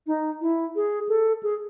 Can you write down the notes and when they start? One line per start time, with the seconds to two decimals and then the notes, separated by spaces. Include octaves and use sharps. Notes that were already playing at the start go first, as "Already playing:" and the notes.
0.07 D#4
0.41 E4
0.76 G#4
1.09 A4
1.43 G#4